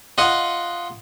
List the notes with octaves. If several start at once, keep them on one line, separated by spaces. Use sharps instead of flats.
F4 D#5 F#5